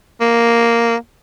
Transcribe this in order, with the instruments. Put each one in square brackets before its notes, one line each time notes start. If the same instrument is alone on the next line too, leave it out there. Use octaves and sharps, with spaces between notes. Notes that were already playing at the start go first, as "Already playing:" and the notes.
[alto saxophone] A#3